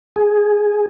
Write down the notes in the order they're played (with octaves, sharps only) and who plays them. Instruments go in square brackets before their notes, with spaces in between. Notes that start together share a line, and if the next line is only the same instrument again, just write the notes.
[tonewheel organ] G#4